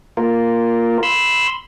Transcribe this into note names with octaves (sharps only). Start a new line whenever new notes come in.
A#3 F4 A#4
B5 C6 E6